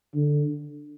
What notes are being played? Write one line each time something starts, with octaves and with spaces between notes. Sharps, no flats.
D3